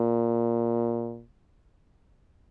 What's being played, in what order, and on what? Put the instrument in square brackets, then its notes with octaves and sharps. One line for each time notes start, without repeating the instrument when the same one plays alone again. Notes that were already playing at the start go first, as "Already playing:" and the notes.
Already playing: [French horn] A#2